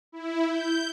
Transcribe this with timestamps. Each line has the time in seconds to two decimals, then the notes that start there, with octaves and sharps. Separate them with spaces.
0.12 E4
0.48 G6